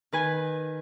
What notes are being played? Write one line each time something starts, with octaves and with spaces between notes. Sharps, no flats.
D#3 B4 G#5